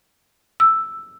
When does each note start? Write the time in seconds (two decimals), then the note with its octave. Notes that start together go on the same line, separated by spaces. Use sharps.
0.60 E6